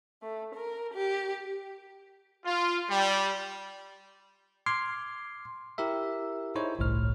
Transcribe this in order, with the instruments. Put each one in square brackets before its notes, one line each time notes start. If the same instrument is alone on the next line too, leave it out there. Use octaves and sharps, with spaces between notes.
[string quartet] A3
A#4
G4
[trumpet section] F4
G3
[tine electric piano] C6 D6 F6 G#6 C7
E4 G4 A#4 E5
D#4 E4 G#4 C5 C#5
G1 C2 A2 C#5 F6